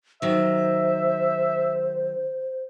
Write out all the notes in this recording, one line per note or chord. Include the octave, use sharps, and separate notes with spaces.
D#3 F#3 C5 E5